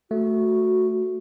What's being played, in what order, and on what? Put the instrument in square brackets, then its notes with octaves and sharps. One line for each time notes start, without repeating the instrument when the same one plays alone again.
[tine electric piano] A3 [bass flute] F#4